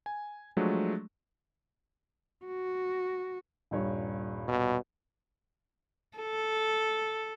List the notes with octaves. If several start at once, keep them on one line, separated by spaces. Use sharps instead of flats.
G#5
F3 F#3 G#3 A3 D4
F#4
D#1 G2 C#5
B2
A4